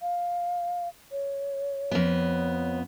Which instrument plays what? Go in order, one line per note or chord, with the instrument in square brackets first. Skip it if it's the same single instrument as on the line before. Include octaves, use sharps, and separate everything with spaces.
[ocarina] F5
C#5
[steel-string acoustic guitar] F2 B3